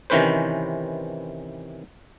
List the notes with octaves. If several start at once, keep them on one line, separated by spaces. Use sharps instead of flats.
C3 D#3 E3 C#4 B4 C5